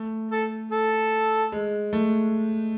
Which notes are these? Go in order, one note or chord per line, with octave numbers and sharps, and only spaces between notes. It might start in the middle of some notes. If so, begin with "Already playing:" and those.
Already playing: A3
A4
A4
G#3
A3